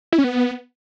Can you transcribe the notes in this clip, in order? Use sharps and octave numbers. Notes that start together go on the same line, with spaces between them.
E4
C#4
B3